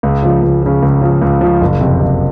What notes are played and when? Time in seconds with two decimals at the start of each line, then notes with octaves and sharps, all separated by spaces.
0.03 C#2
0.22 C#3 F3
0.42 C#2
0.63 C#3 F3
0.82 C#2
1.01 C#3 F3
1.21 C#2
1.41 C#3 F3
1.61 F#1
1.81 F2 C3
2.01 F#1